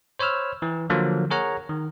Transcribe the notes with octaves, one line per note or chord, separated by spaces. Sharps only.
C5 C#5 B5 E6 F6
E3
D3 F3 F#3 A#3
G#4 A#4 C#5 F#5 A#5
D#3